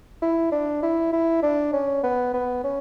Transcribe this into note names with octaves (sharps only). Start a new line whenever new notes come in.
E4
D4
E4
E4
D4
C#4
B3
B3
C#4